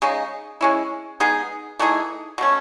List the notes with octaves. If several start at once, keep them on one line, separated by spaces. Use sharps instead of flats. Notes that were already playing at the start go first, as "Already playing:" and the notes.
C#3 G#3 D#4
G#3 C#4 E4
G#3 B3 D#4 G#4
E3 A3 D#4 G#4
B2 A3 C#4